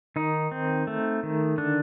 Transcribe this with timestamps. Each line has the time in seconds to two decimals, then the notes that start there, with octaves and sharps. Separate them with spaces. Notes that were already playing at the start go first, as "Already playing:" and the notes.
0.16 D#3 D#4
0.52 C4
0.87 A3
1.23 D#3
1.58 D3 D4